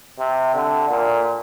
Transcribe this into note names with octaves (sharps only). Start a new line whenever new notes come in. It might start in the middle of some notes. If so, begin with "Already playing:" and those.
C3
D3
A#2